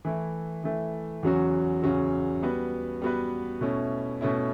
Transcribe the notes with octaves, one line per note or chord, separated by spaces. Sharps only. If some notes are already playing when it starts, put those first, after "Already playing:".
E3 A3 E4
E3 A3 E4
E2 C#3 F#3 C#4 F#4
E2 C#3 F#3 C#4 F#4
G3 B3 F#4 B4
G3 B3 F#4 B4
B2 A3 C#4 E4
B2 A3 C#4 E4